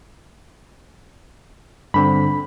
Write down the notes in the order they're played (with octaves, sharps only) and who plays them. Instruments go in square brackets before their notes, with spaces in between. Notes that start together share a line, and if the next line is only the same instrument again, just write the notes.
[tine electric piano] G2 D3 C4 [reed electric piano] B5